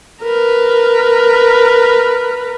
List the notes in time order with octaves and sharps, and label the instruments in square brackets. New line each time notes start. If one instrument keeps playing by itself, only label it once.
[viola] A#4 B4